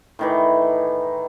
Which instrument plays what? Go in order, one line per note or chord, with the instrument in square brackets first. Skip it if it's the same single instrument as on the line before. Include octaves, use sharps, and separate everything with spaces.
[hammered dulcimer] A2 D#3 E3